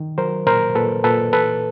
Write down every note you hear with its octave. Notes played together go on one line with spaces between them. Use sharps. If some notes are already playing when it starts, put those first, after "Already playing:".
Already playing: D#3
F#3 A#4 C5
A#2 A#4 C5
A#2 A4 B4
A#2 A4 B4
E3 A4 B4